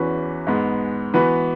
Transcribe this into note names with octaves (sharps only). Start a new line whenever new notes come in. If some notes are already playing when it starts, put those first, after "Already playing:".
Already playing: E2 E3 C#4 F#4 B4
G#2 G#3 B3
E3 B3 F#4 B4